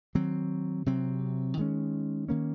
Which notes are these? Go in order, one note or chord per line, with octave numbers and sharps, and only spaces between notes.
D#3 F#3 C4
C3 F#3 C4
D#3 G#3 C#4
D#3 A#3 C#4